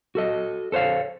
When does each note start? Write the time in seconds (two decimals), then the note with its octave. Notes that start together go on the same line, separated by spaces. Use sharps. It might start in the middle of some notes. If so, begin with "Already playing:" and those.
0.15 F#4 A4 D#5
0.72 A4 C5 C#5 F5